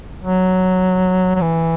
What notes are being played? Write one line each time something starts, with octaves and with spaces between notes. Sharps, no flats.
F#3
F#3
E3